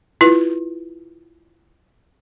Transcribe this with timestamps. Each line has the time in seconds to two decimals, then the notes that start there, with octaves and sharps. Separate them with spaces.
0.21 E4 F4 B4